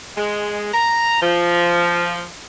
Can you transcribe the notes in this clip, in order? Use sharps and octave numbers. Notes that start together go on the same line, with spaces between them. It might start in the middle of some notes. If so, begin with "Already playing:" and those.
G#3
A#5
F3